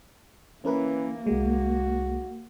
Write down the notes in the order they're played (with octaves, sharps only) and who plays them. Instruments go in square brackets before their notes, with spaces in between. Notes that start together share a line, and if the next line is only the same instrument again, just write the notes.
[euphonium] E3 [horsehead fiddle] A#3 [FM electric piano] C#4 A#4 B4
[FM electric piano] C2 G#3 [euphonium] F#4